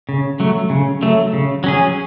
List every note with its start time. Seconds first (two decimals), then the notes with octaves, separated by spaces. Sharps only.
0.09 C#3
0.40 F#3 A3
0.70 C#3
1.02 F#3 A3
1.33 C#3
1.64 F#3 C#4 G#4